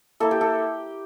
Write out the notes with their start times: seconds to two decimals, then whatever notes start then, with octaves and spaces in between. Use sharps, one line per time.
0.20 A#3 E4 A4
0.31 G4
0.41 A4